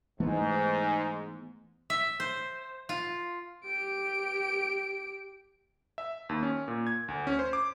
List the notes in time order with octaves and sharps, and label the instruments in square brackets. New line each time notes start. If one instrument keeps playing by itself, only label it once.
[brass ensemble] G#2 [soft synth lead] E3 [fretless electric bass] A3 B3
[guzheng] E5
C5
F4
[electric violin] G4 D7
[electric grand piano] E5
D#2
C#4
A#2
G#6
D2
C#4
C5
D6